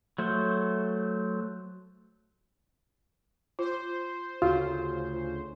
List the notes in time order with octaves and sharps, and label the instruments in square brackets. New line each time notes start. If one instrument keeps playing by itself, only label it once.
[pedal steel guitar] F#3 A3 C5
[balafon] F4 [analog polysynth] C5
[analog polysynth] D2 C#3 C5 [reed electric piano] F4 [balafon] F#4